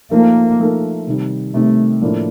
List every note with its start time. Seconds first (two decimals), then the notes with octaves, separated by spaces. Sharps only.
0.11 F3 A3 A#3 D#4 A#4
0.59 F3 A3 D#4 A#4
1.07 C3 D#3 G3
1.54 C3 D#3 G3 A3
2.02 A2 F3 A#3 D4